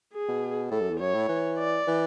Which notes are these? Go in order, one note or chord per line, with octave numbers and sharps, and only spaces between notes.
G#4
B2
A2 A4
F#2
E2
F#2 C#5
A2
E3
D5
E3